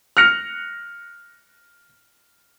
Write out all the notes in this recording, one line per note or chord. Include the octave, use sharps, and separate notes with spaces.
F6 F#6 A#6 C#7 F7